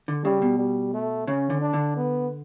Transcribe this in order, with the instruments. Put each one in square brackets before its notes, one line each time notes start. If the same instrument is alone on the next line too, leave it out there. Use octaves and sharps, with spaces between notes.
[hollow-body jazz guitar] D3
[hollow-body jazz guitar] C#3 [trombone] G3
[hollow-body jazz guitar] B2
[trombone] G3
A3
[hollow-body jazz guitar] C#3 [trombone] C#4
[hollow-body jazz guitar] D3
[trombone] D4
[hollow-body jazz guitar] D3
[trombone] B3